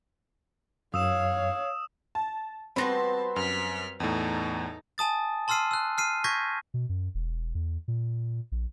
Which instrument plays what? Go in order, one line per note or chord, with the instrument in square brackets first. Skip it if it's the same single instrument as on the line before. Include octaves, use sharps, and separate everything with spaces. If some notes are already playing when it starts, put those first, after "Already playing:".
[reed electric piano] F#2 [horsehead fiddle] C#5 F5 [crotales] D#6 E6 E7
[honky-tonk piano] A5
[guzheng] G3 B3 F#4 [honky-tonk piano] C4 A#6 [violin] A5 [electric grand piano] B5 C6
[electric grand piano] F#2 [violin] F6 B6
[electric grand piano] E2 A2 [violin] D#4 A4
[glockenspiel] G#5 A5 D#6 A6
A5 C6 E6 F6 C7 D#7
E6 F#6
F6 C7 D#7
C#6 G6 G#6 A#6 B6
[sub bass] B2
F#2
E1
E2
A#2
A#1